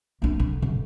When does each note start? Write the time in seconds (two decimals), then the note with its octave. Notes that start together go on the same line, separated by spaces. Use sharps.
0.22 A#3 D4
0.39 D3
0.62 D3